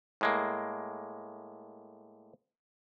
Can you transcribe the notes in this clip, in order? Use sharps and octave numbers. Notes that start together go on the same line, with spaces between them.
A2 G#3 A#3